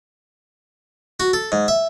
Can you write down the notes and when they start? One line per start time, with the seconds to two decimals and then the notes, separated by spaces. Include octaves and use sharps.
1.20 F#4
1.33 A4
1.52 G#2
1.68 E5